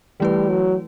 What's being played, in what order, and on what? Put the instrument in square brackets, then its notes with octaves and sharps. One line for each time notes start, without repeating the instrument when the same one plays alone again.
[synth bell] E3 A3 E4 B4 [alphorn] G3
[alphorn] F#3